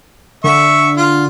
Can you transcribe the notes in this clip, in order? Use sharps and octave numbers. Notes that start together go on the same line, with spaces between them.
D3 E5 C#6
F4